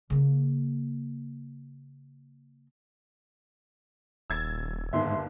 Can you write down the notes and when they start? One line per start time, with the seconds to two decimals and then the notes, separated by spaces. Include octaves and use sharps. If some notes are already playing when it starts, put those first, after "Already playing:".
0.10 C#3 A#3
4.30 D#1 E6 G#6 A6
4.93 G1 D#2 G#2 D#3 E5 C6